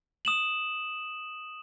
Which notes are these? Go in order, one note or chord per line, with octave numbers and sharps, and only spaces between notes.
D#6 E7 F#7